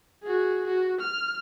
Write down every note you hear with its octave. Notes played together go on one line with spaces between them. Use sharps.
F#4 G#4
F#4
F6